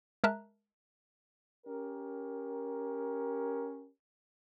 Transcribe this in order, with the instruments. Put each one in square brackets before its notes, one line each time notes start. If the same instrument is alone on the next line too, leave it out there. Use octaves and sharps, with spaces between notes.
[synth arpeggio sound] G#3 A#4 E5 A5 A#5 F#6
[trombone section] C#4 G4 A#4